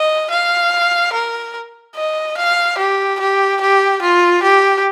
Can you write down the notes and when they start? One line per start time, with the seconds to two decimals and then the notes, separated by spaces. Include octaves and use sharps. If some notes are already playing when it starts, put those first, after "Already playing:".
Already playing: D#5
0.31 F5
1.13 A#4
1.96 D#5
2.37 F5
2.78 G4
3.20 G4
3.61 G4
4.02 F4
4.43 G4